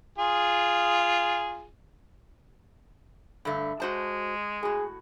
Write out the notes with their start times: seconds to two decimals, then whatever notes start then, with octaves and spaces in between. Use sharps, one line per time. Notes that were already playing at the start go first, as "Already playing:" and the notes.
0.18 F4 G#4
3.45 G2 D3 A3
3.80 G#3 F#4 C5 A5
4.63 A2 F#4 G#4